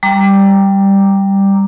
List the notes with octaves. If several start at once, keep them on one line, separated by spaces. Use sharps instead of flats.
G3 A#5 D6